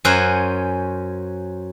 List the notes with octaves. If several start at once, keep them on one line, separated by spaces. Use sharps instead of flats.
F#2 C#4 C5 F#5 G#5